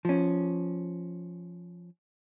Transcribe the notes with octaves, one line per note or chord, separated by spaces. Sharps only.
F3 C#4